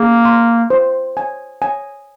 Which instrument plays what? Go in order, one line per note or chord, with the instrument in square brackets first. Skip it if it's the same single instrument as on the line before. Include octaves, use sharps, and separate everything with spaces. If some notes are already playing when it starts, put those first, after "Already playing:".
Already playing: [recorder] A#3 [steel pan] G#4
[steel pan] C6
C5
G#5
G#5